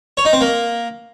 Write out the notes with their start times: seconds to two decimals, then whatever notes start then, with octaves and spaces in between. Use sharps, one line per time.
0.17 C#5
0.25 D#4
0.33 C4
0.41 A#3